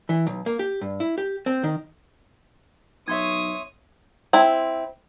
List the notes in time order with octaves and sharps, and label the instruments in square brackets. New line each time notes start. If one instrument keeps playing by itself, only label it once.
[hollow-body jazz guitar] E3
B1
A#3
G4
G2
E4
G4
C4
D#3
[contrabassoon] B1 [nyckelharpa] C#5 D#6 [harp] E5 C6 G#6
[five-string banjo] C4 E4